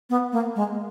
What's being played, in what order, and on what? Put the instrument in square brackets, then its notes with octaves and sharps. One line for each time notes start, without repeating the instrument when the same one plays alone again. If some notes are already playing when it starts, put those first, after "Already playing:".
[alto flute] B3
A#3
G#3